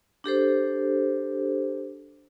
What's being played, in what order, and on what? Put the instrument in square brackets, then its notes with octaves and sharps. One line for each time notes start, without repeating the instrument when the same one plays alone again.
[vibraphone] D4 G4 A4 C5